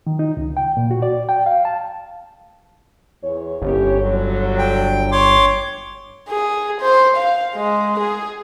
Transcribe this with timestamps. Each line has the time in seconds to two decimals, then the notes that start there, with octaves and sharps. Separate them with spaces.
0.07 D#3
0.19 D#4
0.37 C#2
0.57 G5
0.77 A#2
0.91 F#4
1.02 D5
1.29 G5
1.46 F5
1.65 A5
3.22 E2 C#5
3.62 G1 C#4 G4 C#5
4.00 D3 F#3
4.58 G5
5.12 C#5 C6 D6
6.29 G#4
6.81 C5
7.17 F5
7.55 G#3
8.00 G#4